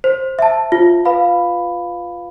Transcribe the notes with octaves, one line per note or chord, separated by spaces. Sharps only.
C5
E5 A5
F4
B4 F5 B5